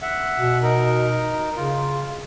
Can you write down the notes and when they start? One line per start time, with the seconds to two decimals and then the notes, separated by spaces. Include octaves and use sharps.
0.02 E5 F#5
0.38 B2
0.62 D#4 A#4
1.56 C#3 F4